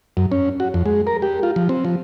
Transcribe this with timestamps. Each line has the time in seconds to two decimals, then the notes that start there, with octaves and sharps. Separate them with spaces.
0.17 F#2
0.32 C#4
0.60 F#4
0.74 F2
0.86 G#3
1.07 A#4
1.22 G4
1.43 F4
1.56 F3
1.69 C4
1.85 F3